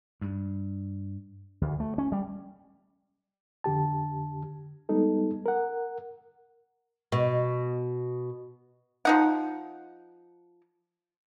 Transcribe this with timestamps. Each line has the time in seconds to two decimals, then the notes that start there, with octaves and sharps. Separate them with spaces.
0.21 G2
1.61 D2
1.80 A3
1.98 C#4
2.12 G3
3.64 F2 D3 G4 A5
4.89 G3 G#3 B3 D#4 A4
5.46 A#4 F#5
7.12 B2
9.05 F3 D#4 F#5